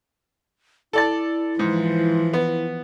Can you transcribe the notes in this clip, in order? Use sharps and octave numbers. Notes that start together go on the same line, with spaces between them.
E4 A4 D5 A5
G#2 E3 F3
B3